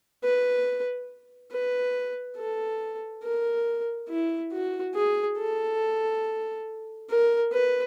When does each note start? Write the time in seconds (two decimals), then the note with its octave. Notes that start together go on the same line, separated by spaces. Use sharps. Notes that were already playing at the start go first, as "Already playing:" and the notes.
0.23 B4
1.51 B4
2.38 A4
3.23 A#4
4.09 E4
4.52 F#4
4.95 G#4
5.38 A4
7.09 A#4
7.52 B4